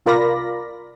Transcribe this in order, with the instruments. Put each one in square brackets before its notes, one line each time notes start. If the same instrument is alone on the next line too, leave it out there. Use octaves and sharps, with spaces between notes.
[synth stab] C2 F4 A#4 D5 B5 A#6